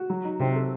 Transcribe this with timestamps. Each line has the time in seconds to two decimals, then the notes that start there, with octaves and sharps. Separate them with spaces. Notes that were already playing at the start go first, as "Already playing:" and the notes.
Already playing: F#4
0.10 F#3
0.25 D#4
0.40 C3 C4
0.56 A4